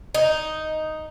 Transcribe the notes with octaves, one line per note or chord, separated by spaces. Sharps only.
D#4